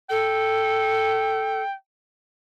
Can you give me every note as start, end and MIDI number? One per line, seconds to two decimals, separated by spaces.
0.10 1.62 69
0.10 1.73 79